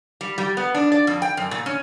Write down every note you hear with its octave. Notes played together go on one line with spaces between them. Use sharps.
G3
G3
B3
D4
D5
F2
G5
F#2
A#2
C#4